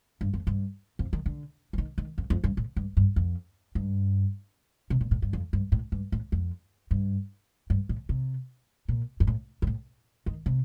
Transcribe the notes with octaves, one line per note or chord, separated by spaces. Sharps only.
G2
F2
G2
F2
D#3
D3
F3
D#3
D#3
F2
F2
G2
A2
G2
G2
F2
G2
C3
A#2
A2
G2
F2
G2
A2
G2
A2
F2
G2
G2
A2
C3
A#2
G2
A2
G2
A2
D#3
C3